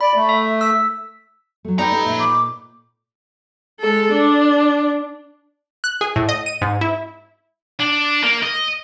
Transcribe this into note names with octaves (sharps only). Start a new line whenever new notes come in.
D5 B5
A3
E5
E6 B6
F#3 A3
D#4 B4 C#5 D5 G5 A#5
A3 C#4 G4 D#5
A#2 E5
D6
G#3 A4
D4
F#6
G#4
A2
D#5
D#7
G#2
E4
D4
A#3
D#5